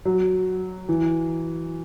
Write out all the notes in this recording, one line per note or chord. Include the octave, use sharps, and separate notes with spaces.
F#3
E3